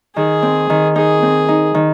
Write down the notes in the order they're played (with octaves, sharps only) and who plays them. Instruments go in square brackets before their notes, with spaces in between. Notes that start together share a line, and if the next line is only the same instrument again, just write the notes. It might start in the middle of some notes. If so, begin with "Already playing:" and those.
[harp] D#3 [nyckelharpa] G#4
[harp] C4
D#3
[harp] D#4 [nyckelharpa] G#4
[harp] C4
D#4
D#3